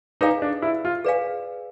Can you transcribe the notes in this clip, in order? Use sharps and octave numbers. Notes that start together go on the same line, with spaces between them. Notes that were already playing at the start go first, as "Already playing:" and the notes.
D#4 G#4 B4 D5 F5 G#5
D4
E4
F4
G#4 B4 D5 F5 G#5